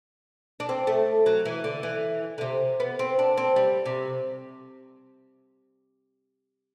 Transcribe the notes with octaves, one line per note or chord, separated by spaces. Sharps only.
D4
C4
A3
F#3
E3
D3
E3
D3
C3
B3
C4
D4
C4
G3
C3